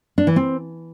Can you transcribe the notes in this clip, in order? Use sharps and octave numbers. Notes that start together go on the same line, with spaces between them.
D4
E3
C4